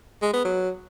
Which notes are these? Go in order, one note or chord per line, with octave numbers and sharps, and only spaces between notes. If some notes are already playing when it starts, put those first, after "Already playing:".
G#3
B3
F#3